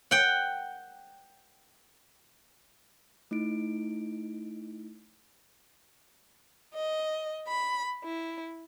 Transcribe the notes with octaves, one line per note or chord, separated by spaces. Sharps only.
F#5 G5
A3 D#4 E4 D7
D#5
B5
E4